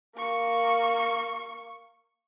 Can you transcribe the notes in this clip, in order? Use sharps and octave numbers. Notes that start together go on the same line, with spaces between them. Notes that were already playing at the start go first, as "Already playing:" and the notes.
A#3 C#6